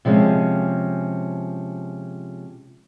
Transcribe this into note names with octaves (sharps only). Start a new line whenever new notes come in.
C3 F3 G#3 C#4